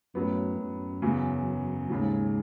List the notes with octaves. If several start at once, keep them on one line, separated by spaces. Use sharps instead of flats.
F#2 A2 F#3 B3
F#2
E2 C#3 F#3
D#2 G#2 C#3 F#3